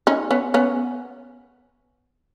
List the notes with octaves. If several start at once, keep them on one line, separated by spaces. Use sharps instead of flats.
C#4 D#4
B3 C#4
B3 C#4